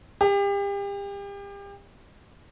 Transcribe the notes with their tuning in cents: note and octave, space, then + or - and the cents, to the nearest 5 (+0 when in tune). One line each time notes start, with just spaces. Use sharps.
G4 +35